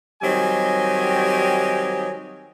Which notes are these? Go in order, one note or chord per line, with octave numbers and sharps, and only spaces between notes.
D#3 F#3 G3 C4 D#5 G#5